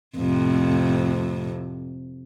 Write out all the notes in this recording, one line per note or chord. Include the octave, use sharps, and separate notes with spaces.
F2 A2 C3